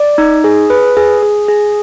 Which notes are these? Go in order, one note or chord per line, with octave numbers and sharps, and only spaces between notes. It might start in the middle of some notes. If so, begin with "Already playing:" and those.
Already playing: D5
D#4
G#4
B4
G#4
G#4
G#4